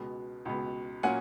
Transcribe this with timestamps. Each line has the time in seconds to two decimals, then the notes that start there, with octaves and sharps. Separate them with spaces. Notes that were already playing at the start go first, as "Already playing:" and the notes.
Already playing: C#2 B2 G#3 B3
0.45 C#2 B2 G#3 B3
1.03 A#2 F#3 A#3 C#4 F#5 G#5